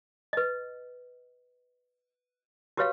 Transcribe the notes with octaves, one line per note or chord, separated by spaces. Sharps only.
B4 D#5
F#4 G4 B4 C#5 F5